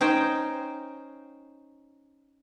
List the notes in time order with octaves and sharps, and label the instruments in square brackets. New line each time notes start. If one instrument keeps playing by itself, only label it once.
[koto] C#4 D#4 C5 G5